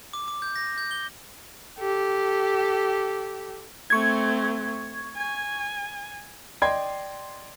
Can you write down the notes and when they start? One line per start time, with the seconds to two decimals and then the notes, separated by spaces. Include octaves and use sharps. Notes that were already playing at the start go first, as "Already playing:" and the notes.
0.13 D6
0.28 D6
0.42 G6
0.56 A#6
0.78 G6
0.91 G7
1.79 G4 A4
3.90 A3 C4 C#6 G#6
5.17 G#5
6.62 D5 D#5 G5 C6 G#6